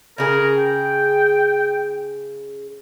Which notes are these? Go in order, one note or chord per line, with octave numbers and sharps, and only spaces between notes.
C#3 G#4 A#4
G5